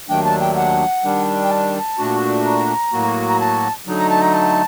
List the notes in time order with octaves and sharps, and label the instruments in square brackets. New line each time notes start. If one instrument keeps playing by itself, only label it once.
[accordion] D#2 D#3 F#3 A3 D4 [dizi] G5
[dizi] A5
G5
F#5
[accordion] D#3 G3 D4
[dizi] G5
A5
[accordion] A#2 A3 D4 F#4
[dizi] A#5
[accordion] A2 F#3 A#3 F#4
[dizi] A#5
A5
[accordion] D3 F#3 A3 D#4
[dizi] A#5
A5
A#5
A5